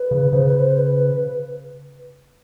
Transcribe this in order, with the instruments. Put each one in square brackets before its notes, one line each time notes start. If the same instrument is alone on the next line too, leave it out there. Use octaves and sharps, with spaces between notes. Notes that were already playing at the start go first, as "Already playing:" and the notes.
Already playing: [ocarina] B4
[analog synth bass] C#3
[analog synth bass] C#3 [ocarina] C5
[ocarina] B4
C5
B4